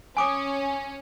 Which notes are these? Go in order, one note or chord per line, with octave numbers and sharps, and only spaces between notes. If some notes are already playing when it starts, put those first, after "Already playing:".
C#4 G#5 D6 D#6